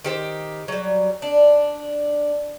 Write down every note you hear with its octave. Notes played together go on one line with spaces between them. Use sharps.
D#3 G4 C5
F#3 G3
D4